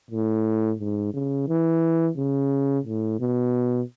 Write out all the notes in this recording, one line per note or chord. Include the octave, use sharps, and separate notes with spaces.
A2
G#2
C#3
E3
C#3
A2
B2